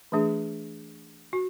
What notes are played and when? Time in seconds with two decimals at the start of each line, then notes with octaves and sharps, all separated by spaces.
0.12 E3 A3 D4 G#4
1.33 F#4